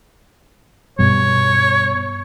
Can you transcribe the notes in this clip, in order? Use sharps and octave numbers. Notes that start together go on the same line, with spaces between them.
G2 B2 G3 C#5